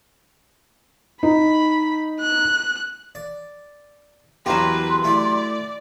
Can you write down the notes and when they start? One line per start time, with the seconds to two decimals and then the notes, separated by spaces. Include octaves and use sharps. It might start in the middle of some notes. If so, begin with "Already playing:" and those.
1.23 D#4 B5
2.21 F#6
3.15 D5
4.46 E2 E3 F#3 A#3 G4 B4 C6
5.04 A3 E4 D5